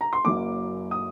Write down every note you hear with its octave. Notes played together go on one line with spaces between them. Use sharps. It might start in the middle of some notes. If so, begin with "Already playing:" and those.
A#5
C6
F#1 F#2 F#3 A#3 D6
D#6